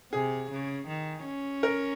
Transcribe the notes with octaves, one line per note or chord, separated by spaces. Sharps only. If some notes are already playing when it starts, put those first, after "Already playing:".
C3 G#4
C#3
D#3
C#4
A#4